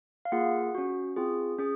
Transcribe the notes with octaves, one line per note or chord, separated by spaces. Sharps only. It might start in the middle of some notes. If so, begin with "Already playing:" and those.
F5
A#3 F4 G#4 F#5
C#4 F#4
C4 F4 G#4
C#4 G#4